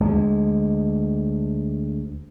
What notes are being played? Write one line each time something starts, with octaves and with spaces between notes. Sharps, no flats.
D2 G#3